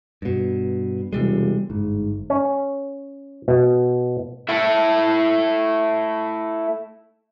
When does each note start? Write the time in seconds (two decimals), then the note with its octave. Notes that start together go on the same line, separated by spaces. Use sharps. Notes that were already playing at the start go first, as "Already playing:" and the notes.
0.22 G2 B2
1.13 E1 C3 G3 G#3
1.70 G1 G#2
2.30 C#4
3.48 B2
4.49 A3 E4